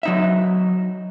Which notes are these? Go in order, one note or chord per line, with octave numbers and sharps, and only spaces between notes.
F#3 D#4 E5